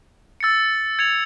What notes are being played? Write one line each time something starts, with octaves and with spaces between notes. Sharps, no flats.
E6 A6 C#7
G#6 C#7 F7